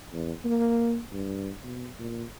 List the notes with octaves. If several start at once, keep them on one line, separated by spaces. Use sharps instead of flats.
E2
A#3
G2
B2
A#2